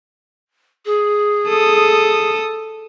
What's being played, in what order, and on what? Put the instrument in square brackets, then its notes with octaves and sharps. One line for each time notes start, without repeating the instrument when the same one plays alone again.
[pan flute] G#4
[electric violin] A4 D#6